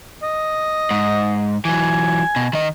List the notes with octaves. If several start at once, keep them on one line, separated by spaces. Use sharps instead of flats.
D#5
G#2
E3 F#3 G#5
B2
D#3 D#5